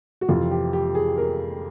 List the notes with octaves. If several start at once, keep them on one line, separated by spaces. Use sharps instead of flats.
F#4
F2 C3 E3 F4
G4
G4
G#4
A#4